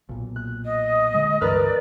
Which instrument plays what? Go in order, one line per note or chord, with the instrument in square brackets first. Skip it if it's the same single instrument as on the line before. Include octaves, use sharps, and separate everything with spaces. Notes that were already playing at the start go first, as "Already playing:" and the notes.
[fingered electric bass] B1 A#2
[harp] F#6
[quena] D#5
[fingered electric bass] D3 G#3
[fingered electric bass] C#2 G2 E3 [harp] A#4 B4 F6 [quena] D5